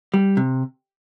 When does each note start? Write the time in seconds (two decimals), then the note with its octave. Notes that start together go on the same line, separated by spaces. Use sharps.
0.14 G3
0.37 C3